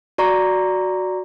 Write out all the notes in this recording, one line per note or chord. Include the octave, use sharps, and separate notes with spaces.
F#4 D5 A#5 C#6